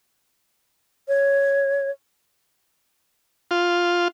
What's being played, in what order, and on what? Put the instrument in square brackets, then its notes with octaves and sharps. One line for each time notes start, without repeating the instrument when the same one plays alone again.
[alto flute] C#5
[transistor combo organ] F4